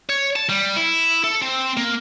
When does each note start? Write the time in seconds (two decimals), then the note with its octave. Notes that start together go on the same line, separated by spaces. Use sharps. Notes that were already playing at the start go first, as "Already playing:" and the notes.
0.10 C#5
0.36 A5
0.49 G3
0.76 E4
1.24 A4
1.42 C4
1.77 A#3